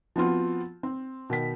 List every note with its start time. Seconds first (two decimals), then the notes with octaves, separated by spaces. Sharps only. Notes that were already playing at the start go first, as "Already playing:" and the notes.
0.16 F3 B3 C4 F4 F#4
0.83 C4
1.30 B2 D#3 B6